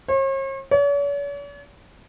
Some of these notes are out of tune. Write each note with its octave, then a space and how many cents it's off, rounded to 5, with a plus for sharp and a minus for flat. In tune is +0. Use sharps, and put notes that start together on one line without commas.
C#5 -45
C#5 +45